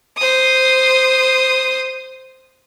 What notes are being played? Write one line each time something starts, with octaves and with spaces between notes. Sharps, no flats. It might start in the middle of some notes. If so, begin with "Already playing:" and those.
C5 D#6